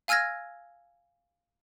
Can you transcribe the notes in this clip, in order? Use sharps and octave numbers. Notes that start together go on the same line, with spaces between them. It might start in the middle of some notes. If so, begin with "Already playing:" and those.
F5 G#5 E6 F6 G#6 A#6